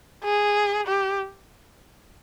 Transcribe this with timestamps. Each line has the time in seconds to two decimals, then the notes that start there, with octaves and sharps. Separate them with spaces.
0.24 G#4
0.87 G4